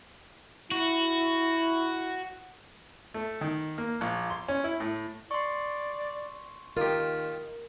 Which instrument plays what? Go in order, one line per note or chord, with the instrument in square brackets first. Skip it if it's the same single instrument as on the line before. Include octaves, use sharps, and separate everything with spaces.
[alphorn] E4 [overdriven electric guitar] F#4
[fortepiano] A3
D#3
A#3
A#1
C6
C#4
E4
A2
[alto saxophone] D5 [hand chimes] C6 C#6
[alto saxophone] D#3 [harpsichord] F4 G4 [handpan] A#4